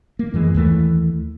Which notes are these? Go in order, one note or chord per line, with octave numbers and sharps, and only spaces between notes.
A#3
F#2 E3 G#3
D#2 E3 A3